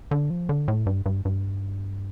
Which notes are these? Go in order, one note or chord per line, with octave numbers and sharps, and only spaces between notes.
D3
F3
D3
A2
G2
G2
G2